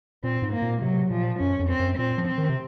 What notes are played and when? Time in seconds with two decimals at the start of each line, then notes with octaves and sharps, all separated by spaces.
0.23 A#2 C4
0.42 G#2
0.53 A#3
0.62 A#2
0.81 C3 F#3
1.10 A#2 F3
1.40 F#2 C#4
1.59 F2
1.69 C4
1.79 F#2
1.98 A#2 C4
2.18 F3
2.27 C4
2.38 D#3
2.49 C3